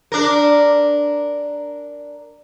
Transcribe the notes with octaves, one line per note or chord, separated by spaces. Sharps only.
D4 A#4